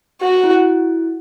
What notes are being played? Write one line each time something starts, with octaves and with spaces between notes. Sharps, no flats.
F#4
E4